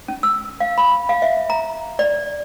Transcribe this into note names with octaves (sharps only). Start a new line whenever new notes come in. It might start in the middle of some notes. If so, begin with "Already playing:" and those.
C#4
E6
F5
B5
F5
E5
A#5
D5